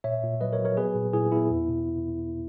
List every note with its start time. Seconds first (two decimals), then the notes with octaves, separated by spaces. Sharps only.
0.04 A#2 C#5 E5
0.23 A#2
0.41 F#3 B4 D#5
0.53 A#4 C#5
0.59 F#3
0.65 A#4 C#5
0.77 B3 G#4 B4
0.95 A#2
1.13 A#2 E4 G#4
1.32 B3 E4
1.50 E2
1.69 B2